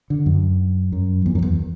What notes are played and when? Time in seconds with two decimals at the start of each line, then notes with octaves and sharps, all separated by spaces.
0.10 D3
0.26 F#2
0.92 F#2
1.26 E2
1.35 F#2
1.42 E2